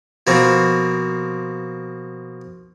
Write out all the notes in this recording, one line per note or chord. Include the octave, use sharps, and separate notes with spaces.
B2 F3 A#3 C4